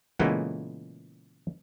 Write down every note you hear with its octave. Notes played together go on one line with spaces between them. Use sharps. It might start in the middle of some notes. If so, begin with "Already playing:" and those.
A#2 C#3 E3 G#3 A3 B3